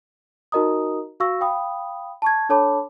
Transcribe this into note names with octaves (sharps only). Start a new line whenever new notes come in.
D#4 F#4 A#4 D#5 A#5 D#6
F#4 F5 C#6 E6 A#6
F5 G5 B5 D#6
A5 C#6 G#6
D4 A4 C#5 A5 B5 D6